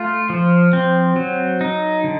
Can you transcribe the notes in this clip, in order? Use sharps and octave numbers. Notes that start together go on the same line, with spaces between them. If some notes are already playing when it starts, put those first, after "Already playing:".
Already playing: A3 F4
F3
C4
F#3
D#4
D3